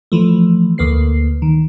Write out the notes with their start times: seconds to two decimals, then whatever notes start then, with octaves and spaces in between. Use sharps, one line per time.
0.12 E3 F3 A3
0.78 D2 A#3 B4 C7
1.42 D#3